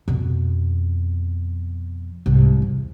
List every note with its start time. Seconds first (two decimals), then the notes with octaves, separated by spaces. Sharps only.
0.08 F2 B2
2.26 C2 G#2
2.62 E2